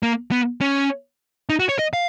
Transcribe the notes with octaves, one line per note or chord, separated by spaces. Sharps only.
A#3
B3
C#4
D#4
F#4
C#5
D#5
F5